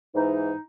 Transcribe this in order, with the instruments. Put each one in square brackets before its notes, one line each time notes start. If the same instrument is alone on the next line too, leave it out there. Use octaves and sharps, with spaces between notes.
[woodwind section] G#2 E3 D#4